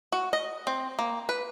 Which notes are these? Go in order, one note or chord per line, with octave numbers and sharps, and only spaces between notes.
F#4
D#5
C4
A#3
B4